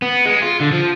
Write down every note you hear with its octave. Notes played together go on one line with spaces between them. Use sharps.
B3
G#3
F4
D3
F3